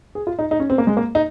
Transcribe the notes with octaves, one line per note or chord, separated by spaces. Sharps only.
G#4
F4
D#4
D#4
C#4
C4
A#3
G#3
A#3
D#4